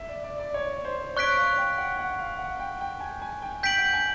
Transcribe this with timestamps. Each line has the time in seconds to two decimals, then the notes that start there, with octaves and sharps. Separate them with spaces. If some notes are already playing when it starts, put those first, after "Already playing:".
Already playing: E5
0.09 D5
0.24 D5
0.39 D5
0.54 C#5
0.85 C5
1.17 C#5 C#6 F#6 B6 D7
1.37 F5
1.58 G5
1.78 F#5
1.99 F#5
2.19 F5
2.39 F#5
2.59 G5
2.81 G5
3.01 G#5
3.22 G#5
3.42 G5
3.63 G5 G6 B6 D7 F#7
3.78 F#5
3.94 G#5